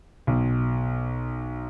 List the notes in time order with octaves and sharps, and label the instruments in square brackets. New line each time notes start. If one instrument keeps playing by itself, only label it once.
[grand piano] B1